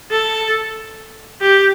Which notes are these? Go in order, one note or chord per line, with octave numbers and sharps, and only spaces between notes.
A4
G4